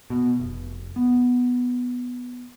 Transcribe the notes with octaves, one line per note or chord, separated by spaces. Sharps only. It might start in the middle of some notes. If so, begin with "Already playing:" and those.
B2
F1
B3